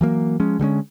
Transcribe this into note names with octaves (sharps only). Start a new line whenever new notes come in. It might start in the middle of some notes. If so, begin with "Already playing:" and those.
E3 F#3 A#3
F3 G#3 C#4
D3 G3 G#3 C#4